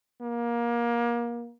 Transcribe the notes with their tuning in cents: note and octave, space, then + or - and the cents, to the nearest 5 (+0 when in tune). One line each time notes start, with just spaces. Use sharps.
A#3 +25